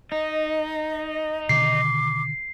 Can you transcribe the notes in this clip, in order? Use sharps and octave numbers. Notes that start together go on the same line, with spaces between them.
D#4 D#5
B2 D3 D#3 D6 C7